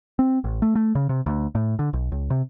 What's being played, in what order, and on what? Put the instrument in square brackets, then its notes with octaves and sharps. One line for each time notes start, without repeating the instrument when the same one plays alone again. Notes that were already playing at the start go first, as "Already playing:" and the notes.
[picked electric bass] C4
A1
A3
A3
C#3
C3
D2
A2
D3
B1
C#2
C3